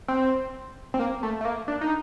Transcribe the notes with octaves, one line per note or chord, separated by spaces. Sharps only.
C4
C4
A#3
A3
A3
A#3
D4
D#4